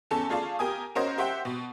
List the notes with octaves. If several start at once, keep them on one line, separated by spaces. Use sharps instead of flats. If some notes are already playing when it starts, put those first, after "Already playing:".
E2 C#4 A4 A5
A3 F4 G#4 D5 F5 A5
G4 A#4 G#5 D#6
C#4 F#4 A#4 C5 C#5 D#5
G4 C5 E5 F#5 G5
B2